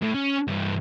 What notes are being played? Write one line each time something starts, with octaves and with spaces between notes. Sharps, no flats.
A2 A3
C#4
G2 E3